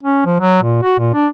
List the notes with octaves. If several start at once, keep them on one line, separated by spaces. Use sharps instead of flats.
C#4
F3
F#3
A#2
F#4
A#2
D4